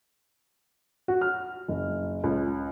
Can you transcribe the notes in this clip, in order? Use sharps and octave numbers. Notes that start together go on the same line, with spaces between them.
F#4
F6
F#1
C#2